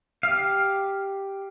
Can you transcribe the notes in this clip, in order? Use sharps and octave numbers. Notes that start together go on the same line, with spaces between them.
G4 F5